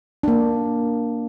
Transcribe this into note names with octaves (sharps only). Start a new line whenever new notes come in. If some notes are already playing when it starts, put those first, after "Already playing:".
A#3 D4